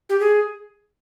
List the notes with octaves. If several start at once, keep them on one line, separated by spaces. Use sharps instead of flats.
G4
G#4